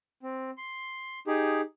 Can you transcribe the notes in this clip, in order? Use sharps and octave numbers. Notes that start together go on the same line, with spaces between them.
C4
C6
D#4 G4 G#4